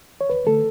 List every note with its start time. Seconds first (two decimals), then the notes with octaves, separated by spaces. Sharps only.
0.21 C#5
0.30 D2 B4
0.47 D3 A3 A4